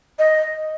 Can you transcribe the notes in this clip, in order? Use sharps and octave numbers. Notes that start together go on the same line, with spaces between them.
D#5